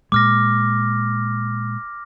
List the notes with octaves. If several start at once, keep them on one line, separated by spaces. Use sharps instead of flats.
A#2 G#3 D6 F6 A#6